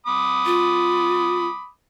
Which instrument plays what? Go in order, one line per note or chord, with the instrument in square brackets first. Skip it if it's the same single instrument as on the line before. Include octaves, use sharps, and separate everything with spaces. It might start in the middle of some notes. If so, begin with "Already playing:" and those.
[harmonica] B5 D6 D#6
[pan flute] F4